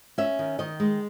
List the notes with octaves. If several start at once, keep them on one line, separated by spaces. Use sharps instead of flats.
C#4 E5
D#3
D#3 D#5
G#3